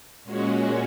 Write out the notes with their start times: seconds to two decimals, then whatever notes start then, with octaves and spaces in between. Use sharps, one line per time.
0.24 A#2 G#3 C#4 F#4